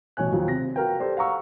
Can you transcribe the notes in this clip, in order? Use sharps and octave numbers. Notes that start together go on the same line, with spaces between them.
A1 B2 C#5 G#5 F#6
D#2 F3 F#3
C3 A#6
F#4 A#4 B4 F5 G5
G4 A4 C5 D5
F5 F#5 A#5 C#6 E6